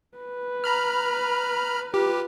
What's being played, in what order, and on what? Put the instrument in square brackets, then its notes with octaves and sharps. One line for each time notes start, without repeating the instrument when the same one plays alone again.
[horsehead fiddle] B4
[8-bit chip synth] A#5 B5 F6
[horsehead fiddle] F4 B4 [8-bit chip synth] G4